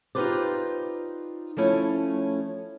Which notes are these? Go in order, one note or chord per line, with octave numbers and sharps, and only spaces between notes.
D#4 F4 G4 B4 C5 D5
F3 A3 C#4 E4 C#5